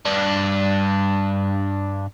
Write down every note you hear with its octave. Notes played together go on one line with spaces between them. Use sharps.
G2 D4